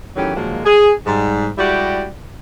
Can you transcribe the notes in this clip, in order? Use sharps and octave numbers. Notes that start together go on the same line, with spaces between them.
D#3 E3 F#3 A3 C#4 G4
A#2 D#3 F3 F#3 G#3 A#3
G#4
G#2 G3
G3 G#3 E4 F#4 G4 D5